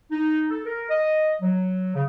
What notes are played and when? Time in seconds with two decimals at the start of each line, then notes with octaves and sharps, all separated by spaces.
0.12 D#4
0.51 A4
0.66 A#4
0.90 D#5
1.42 F#3
1.95 C#3